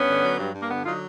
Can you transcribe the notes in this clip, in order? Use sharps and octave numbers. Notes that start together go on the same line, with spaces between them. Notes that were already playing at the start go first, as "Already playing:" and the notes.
Already playing: G2 B3 C#4
D3
F#3
G2
G2
A#3
D3 B3
F#3 D#4 F4